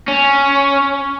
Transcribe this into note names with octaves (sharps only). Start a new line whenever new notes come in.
C#4